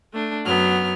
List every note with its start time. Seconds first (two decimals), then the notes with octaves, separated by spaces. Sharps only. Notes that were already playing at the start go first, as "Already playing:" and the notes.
0.13 A3 D4
0.46 F#2 F#3 B3 F6